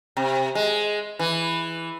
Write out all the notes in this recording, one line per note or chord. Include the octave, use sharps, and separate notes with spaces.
C3
G#3
E3